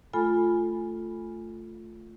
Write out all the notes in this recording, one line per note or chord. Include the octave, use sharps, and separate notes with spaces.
A3 F4 A4 G#5 B5